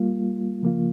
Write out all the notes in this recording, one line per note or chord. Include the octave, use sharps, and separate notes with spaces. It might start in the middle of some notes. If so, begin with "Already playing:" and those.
Already playing: G3 A#3 F4
C#3 F3 A#3 F4